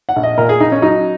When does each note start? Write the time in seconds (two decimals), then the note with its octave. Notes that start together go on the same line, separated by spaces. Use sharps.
0.09 F#5
0.16 A#1
0.23 D#5
0.38 A#2 A#4
0.49 G#4
0.60 A#1 D#4
0.72 C#4
0.82 F#3 D#4